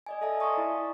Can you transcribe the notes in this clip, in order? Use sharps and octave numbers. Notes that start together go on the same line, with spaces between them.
D5 D#5 G#5
A4 D#5 E5 G#5 A5
D5 F5 A#5 C6 C#6 D#6
E4